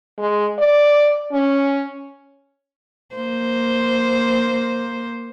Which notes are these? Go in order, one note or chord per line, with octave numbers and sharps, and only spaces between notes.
G#3
D5
C#4
A#3 C5